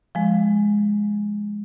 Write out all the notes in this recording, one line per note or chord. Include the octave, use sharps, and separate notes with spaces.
F3 G#3